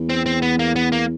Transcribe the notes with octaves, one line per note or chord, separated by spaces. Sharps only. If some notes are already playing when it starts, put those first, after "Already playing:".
Already playing: E2
C4
C4
B3
A#3
B3
A#3